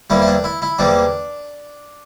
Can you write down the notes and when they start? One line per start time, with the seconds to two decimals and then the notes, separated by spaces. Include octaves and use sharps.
0.10 E2 C3 G3 A#3 E4
0.22 E4
0.27 D4
0.44 E4
0.62 E4
0.79 E2 C3 G3 A#3 D4